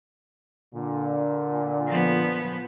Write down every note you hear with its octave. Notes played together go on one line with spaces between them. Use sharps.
A#2 D3
F3 B3